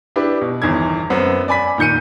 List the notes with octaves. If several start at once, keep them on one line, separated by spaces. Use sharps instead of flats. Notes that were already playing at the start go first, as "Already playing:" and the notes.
D4 E4 G4 B4
B2
G1 E2 D#3 G#6
F#2 B3 C4
D5 G#5 B5 B6
A#2 D#3 G6 C#7 D#7